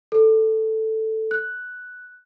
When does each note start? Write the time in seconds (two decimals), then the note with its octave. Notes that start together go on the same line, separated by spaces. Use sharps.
0.12 A4
1.31 F#6